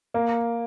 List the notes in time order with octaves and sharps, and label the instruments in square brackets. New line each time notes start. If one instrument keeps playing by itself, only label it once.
[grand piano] A#3